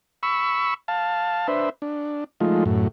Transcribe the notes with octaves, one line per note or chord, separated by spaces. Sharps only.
B5 C#6 E6
F5 A5
D4 B4 C5 E5
D4
F3 G#3 A3 D#4 F4
F#2 A2